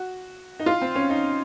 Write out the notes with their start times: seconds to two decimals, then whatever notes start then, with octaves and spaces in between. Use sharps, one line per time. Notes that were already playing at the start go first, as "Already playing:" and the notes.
Already playing: F#4
0.60 D#4
0.66 F4
0.82 C4
0.96 C#4
1.10 D#4